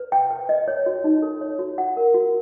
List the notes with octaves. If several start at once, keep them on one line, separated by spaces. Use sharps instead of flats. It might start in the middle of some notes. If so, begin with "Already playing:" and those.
Already playing: B4
G5
B4
D#5
C#5
F#4
D#4
A4
C#5
F#4
F#5
A#4
F#4